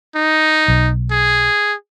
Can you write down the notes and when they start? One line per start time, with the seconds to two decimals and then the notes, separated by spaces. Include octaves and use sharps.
0.16 D#4
0.68 B1
1.11 G#4